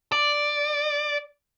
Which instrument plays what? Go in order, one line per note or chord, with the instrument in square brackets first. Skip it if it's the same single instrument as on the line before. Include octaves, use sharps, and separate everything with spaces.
[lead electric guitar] D5